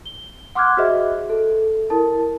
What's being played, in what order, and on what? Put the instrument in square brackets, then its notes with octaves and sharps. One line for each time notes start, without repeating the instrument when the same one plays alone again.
[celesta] G7
F#5 C6 D6 F6 F#6 G#6
F#4 G#4 C5 D#5 E5
A4
E4 A#4 A5